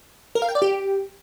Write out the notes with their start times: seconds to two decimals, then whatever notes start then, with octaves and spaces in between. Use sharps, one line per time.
0.35 A#4
0.42 F5
0.49 G5
0.55 D5
0.62 G4